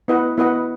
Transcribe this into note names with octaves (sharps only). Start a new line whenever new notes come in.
B3 E4 B4 D#5 F#5
B3 E4 B4 D#5 F#5